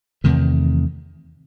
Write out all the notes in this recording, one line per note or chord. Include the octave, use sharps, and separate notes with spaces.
E2 C3 D#3 A3